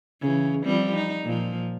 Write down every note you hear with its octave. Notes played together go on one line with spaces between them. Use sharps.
C#3 E3
F3 G3 C4
D#4
A#2 F3